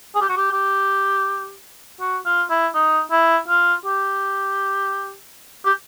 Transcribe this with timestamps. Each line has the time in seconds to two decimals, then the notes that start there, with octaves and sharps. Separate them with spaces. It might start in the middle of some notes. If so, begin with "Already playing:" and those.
0.15 G#4
0.21 G4
0.29 F#4
0.37 G4
0.52 G4
2.00 F#4
2.25 F4
2.50 E4
2.74 D#4
3.11 E4
3.48 F4
3.85 G4
5.65 G4